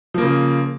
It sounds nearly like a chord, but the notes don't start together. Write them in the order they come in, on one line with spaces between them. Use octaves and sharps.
F3 A#3 C#3